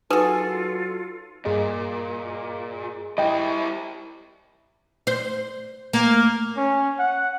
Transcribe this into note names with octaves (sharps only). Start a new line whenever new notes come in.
F#3 D#4 F4 F#4 G#4 A4 B4 E6
G2 A#2 G#4 D#5
G3 E4 D#5 G5
C5
A#3
C#4
F#5